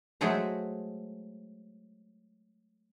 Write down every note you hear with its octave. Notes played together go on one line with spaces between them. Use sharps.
F#3 G#3 A3 G#4 A4 C5